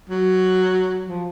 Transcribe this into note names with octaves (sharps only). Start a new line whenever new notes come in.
F#3
F3